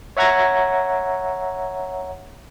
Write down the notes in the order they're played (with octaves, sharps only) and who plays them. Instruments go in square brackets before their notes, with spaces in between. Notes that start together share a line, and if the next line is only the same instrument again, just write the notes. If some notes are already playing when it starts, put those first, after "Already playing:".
[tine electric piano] C#5 E5 F#5 A#5 G#6 A#6